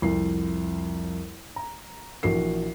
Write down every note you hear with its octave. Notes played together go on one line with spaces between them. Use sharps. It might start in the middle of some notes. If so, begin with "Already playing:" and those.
C2 F2 C7
A#5
A#1 E3 F#4 A#4 C7